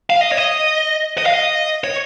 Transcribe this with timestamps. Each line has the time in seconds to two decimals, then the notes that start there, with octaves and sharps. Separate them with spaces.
0.10 F5
0.21 D#5
0.32 C#5
0.37 D#5
1.18 D#5
1.26 F5
1.34 D#5
1.84 C#5